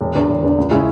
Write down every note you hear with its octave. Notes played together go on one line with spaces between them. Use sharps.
E1
E2 D3
E1
E2 D3
C#2
C#3 G#3 C#4 E4